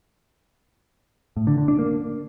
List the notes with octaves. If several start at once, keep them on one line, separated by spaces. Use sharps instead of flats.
A2
D3
D3
D4
A#3